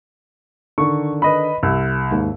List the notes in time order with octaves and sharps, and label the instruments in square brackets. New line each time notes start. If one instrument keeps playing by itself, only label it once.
[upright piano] D3 D#3 [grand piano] C#6
[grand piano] B4 D#5 B5
[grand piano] C2 [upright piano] E6
[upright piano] D#2 G#2